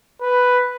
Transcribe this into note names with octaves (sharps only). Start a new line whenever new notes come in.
B4